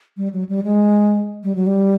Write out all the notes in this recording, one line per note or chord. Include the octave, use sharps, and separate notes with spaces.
G3
F#3
G3
G#3
G3
F#3
G3